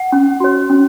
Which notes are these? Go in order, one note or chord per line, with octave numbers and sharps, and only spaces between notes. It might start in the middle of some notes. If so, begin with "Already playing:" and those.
Already playing: F#5
C#4
F#4 C#5
C#4